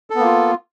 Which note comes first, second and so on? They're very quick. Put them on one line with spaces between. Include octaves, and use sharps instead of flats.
A4 B3 A#3 F4